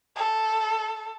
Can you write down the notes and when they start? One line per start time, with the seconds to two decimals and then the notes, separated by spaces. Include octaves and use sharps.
0.16 A4